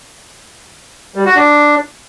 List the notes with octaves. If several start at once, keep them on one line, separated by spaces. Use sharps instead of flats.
G3
F#4
D4